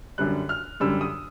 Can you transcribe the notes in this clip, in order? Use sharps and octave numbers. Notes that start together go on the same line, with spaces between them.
F#2 D3 G3 F#6
F6
F#2 D3 G3 E6
D#6